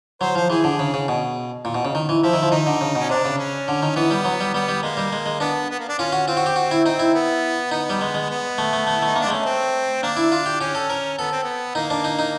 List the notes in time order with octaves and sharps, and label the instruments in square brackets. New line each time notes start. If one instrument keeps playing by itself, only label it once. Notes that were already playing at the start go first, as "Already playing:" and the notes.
[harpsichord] F#3 [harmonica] C5
[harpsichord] F3 [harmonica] C5
[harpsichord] E3 [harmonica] G#4
[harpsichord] D3
C#3
C#3
B2
A#2
B2
C#3
D#3
E3
[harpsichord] F3 [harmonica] E4
[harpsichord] D#3
F3
[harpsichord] D#3 [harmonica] D#4
[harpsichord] D3
C#3
[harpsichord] B2 [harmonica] C#4
[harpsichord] C3 [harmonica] D4
[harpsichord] C#3
[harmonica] C#4
[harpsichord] D3
D#3
[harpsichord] E3 [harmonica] B3
[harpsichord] G3
F#3
G3
[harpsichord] G3 [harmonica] B3
[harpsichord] G3
[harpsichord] G#3 [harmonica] A#3
[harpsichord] G3
G#3
G#3
[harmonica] B3 [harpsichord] D4
[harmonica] B3
A#3
D4
[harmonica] C#4 [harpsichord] F4
[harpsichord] F#4
[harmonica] C4 [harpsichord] F4
[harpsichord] F#4
G4
F#4
E4
[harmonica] C4 [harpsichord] D#4
[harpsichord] E4
[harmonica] B3
[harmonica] B3 [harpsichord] D#4
[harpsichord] G3
G#3
G#3
[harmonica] B3
[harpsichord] A3
A3
A3
[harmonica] E4
[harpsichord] A3 [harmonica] D#4
[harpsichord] A#3 [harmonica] D4
[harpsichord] G#3
[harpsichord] A3 [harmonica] C#4
[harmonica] C4
[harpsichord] A#3 [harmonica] D4
[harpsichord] E4
F4
G4
[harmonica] C#4 [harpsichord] G4
[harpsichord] A4
A#4
[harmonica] B3 [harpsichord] A4
[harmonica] C4
B3
[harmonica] A#3 [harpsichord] D#4
[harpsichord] D4
D#4
D#4